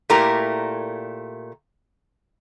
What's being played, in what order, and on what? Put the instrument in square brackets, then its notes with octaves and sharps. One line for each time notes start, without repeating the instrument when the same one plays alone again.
[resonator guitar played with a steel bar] A#2 A3 E4 G4 A#4 A#5